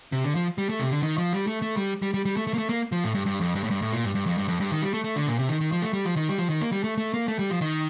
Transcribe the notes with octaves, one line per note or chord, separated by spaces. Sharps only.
C3
D3
F3
G3
A3
C3
D3
D#3
F3
G3
A3
A3
G3
G3
G3
G3
A3
A3
A#3
A3
A#3
F3
A2
G2
G2
F2
G2
A2
G2
A2
A#2
G2
G2
F2
G2
F2
G2
D#3
G3
A3
A3
D3
A#2
C3
D#3
D#3
F3
A3
G3
F3
D#3
G3
F3
D#3
A#3
G3
A3
A3
A#3
A3
G3
F3
D#3